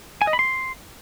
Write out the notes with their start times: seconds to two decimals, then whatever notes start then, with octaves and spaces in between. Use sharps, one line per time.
0.22 G#5
0.27 D#5
0.33 B5
0.39 C6